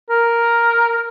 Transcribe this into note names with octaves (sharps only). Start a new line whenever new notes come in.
A#4